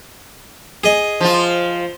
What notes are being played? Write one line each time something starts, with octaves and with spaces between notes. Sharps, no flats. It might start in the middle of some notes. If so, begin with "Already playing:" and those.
G#4 D#5
F3 F4